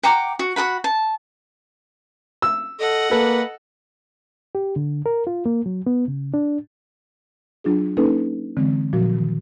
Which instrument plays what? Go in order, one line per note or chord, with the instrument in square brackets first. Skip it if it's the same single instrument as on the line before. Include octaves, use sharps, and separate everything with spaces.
[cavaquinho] F#5 G5 A#5 D6
F#4
F#4 A4 F#5 B5
A5
[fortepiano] E6
[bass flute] A4 [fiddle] D#5 F#5
[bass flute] A#3 [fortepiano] A4 [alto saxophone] B4
[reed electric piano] G4
D3
A#4
F4
A#3
F#3
B3
C#3
D4
[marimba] F#3 D4 F4 G#4
A#3 C#4 D#4 A4 B4
D3 E3 G#3 C4
A#2 F3 F#3 F#4
D#3